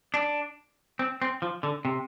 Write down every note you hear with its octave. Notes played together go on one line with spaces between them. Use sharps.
D4
C4
C4
F3
D3
C3